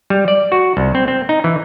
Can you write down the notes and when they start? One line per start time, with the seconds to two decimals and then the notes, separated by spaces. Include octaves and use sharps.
0.10 G3
0.28 D5
0.52 F#4
0.77 C2
0.95 C4
1.08 C4
1.29 D#4
1.44 E3